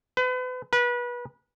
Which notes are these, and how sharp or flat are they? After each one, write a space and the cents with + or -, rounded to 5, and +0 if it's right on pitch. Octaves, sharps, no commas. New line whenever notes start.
B4 +35
B4 -30